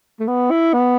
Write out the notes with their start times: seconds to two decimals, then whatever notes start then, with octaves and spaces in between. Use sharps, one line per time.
0.20 A3
0.28 B3
0.51 E4
0.73 B3